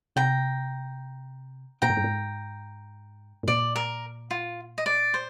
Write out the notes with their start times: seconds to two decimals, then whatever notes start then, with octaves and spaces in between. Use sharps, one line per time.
0.16 C3 G5 A#5
1.82 A#2 G5 A#5
1.90 G#2
1.97 G2
2.04 G#2
3.43 G#2
3.48 A#2 D5
3.76 A#4
4.31 F4
4.78 D#5
4.86 D5
5.14 C5